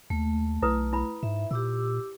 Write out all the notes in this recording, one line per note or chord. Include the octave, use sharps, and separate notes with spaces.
D#2 A3
B1 E4 B4 D#6
E4 B5
G#2 E5
A#2 G4 D6 E6